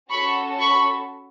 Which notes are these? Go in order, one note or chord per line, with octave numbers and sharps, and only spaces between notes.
C#4 F#4 A4 B5 C#6
B5 C#6